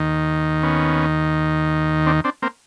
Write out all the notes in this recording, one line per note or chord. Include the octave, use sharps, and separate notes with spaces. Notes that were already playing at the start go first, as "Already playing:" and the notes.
Already playing: D#2 D#3
B3 C#4
C4 D4
C4 D4
A#3 C4